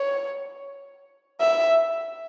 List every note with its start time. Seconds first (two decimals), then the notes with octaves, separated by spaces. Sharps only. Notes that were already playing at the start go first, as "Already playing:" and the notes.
Already playing: C#5
1.40 E5